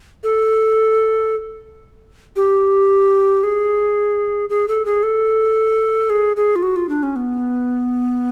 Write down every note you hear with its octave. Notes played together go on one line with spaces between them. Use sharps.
A4
G4
G#4
G#4
A4
G#4
A4
G#4
G#4
F4
F#4
F4
D4
C#4
B3